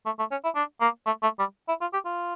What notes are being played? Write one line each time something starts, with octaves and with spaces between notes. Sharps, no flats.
A3
A3
C#4
E4
D4
A#3
A3
A3
G3
E4
F4
G4
F4